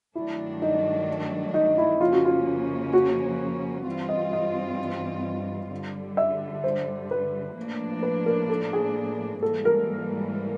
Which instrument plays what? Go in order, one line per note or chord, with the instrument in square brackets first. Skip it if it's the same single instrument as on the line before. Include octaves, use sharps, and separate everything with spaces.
[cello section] G2 D#3 F#3 A3 D4 [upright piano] E4
[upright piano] D#4
D#4
E4
[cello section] F2 C#3 F3 A#3 C#4 [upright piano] F4
[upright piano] F#4
F4
F#4
[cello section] G2 E3 G3 C4 F4
[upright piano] D#5
D#5
[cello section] G2 D3 G3
[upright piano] E5
C5
B4
[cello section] A2 F3 A#3 D4
[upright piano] B4
A#4
A4
G#4
[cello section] G#2 E3 G3 A#3 [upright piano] A4
[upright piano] A#4